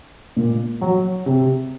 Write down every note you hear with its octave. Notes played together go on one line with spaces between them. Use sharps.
A#2
F#3
C3